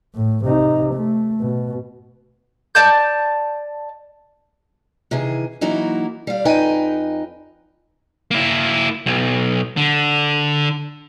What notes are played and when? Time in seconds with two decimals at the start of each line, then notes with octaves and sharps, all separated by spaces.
0.15 A2
0.45 C3 D#4
0.94 A3
1.41 B2
2.75 D5 A5 G6
5.11 C3 D#3 E3 G#4
5.61 E3 F#3 A#3 D#4 E4 F#4
6.27 G3 F5
6.45 F2 D#4 B4 D#5 G5 G#5
8.31 A#3 E4
9.06 B1
9.77 D3